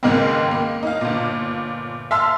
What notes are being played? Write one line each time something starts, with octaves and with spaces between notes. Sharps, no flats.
C#2 G#2 D#3 G#3 A#3 C4
A#3
D#4 F5
G1 A#2
E5 F5 A5 C6 E6 F6